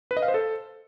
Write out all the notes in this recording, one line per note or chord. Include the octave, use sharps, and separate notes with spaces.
B4
D#5
F5
C5
A4